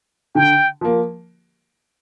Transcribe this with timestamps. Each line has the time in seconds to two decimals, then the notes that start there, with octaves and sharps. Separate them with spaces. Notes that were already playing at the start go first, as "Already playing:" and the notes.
0.35 D3 G5
0.81 F3 A#3